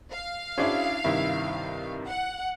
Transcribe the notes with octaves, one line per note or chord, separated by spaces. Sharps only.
F5
C#4 D4 E4 F#4 G#4 C5
G2 C3 D#3 E4
F#5